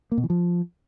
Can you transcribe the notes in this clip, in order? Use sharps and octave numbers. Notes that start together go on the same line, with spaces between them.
A#3
B2
E3
F3